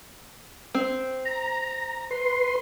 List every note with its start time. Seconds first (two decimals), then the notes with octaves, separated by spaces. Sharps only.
0.75 C4
1.25 A#5
2.11 B4 C6